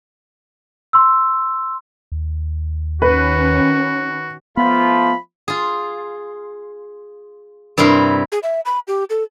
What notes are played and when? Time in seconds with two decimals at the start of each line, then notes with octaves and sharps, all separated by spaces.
0.93 C6 E6
2.12 D#2
3.02 D#3 C#4 F#4 B4
4.57 F3 A3 B3 F4 B5
5.48 F4 G#4
7.78 G2 C3 E4 A#4 C6
8.32 G#4
8.43 E5
8.65 B5
8.88 G4
9.10 A4